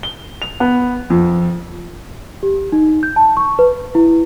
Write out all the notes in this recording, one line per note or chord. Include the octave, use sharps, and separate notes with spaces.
G7
F7
B3
F2
G4
D#4
G6
A5
C#6
B4
E4